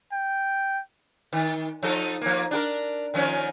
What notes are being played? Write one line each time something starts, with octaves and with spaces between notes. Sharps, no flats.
G5
D#3
F3 D#4 A4
F3 A#3
D4 F#4 A#4
D#3 F3 C#4